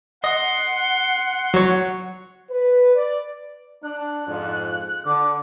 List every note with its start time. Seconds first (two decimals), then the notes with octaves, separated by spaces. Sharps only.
0.24 D#5 F#5 C6
1.54 F#3 C#5
2.50 B4
2.95 D5
3.84 D4 F#6
4.28 F2 G#2 F4
5.05 D3 D6